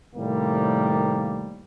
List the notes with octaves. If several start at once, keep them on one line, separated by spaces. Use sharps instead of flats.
A2 C3 D#3 F3 G3 A#3